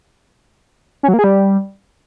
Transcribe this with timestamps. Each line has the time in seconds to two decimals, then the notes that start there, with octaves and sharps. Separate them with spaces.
1.03 C#4
1.08 F#3
1.14 A#3
1.19 G#4
1.24 G3